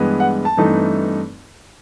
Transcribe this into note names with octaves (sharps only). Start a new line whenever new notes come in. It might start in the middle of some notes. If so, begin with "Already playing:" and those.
Already playing: G2 E3 G#3 B3
F#5
A5
G2 E3 A3 C4 D#4